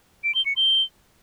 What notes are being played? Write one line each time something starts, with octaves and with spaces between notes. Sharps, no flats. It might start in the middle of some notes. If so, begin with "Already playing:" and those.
D7
G7
C#7
G7